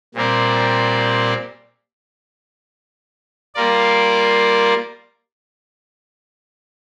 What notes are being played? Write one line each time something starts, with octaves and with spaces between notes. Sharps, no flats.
A#2 G3 C4 A#4 D5
G3 A#3 F4 A#4 D5